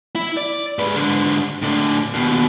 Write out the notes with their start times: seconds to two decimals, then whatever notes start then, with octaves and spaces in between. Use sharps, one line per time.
0.15 E4
0.37 D5
0.79 G#2 B4
0.96 G#2 D3
1.62 A2 D3
2.14 D#2 B2